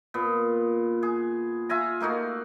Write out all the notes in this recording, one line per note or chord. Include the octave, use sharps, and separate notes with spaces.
A#2 B3
G#4
F4 E5 G#5 A#5
A3 A#3 D#4 F#4